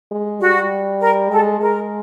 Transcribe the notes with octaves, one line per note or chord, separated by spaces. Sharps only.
G#3
G3 F#4
A#4
G#3 A4
G#3 A#4